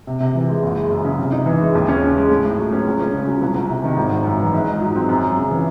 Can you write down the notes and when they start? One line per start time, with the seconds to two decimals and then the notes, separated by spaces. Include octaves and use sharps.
0.07 C3
0.20 C3
0.35 E3
0.48 G#3
0.63 F#1
0.76 G#3
0.91 F#2
1.05 C#3
1.19 C3
1.32 D#4
1.46 E3
1.61 G#3
1.75 D#2
1.88 C#4
2.02 C#3
2.17 G#3
2.30 A2
2.44 A2
2.58 F#3
2.72 C#4
2.86 C#2
2.99 C#4
3.14 C#3
3.27 F#3
3.42 C2
3.55 C2
3.69 C3
3.84 D#3
3.97 G#1
4.11 G#1
4.25 F#2
4.40 E3
4.53 G#2
4.66 D#4
4.81 F#3
4.95 C4
5.09 F#2
5.23 F#2
5.37 C#3
5.51 E3